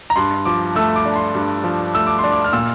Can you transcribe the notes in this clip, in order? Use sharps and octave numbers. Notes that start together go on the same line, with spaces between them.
A#5
G2 C6
F3 D6
A3 E6
D6
D4
C6
G2
F3
A3 E6
D6
D4 C6
D6
F6
A#2 E6